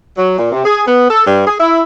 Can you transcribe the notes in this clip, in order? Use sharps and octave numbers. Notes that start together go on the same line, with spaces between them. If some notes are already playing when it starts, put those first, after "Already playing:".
F#3
A#2
C3
G#4
B3
A4
G2
G#4
E4